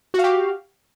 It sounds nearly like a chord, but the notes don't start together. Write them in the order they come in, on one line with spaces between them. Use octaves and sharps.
F#4 F5 G4